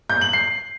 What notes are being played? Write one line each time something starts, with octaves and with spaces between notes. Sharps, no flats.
G6
F#7
C7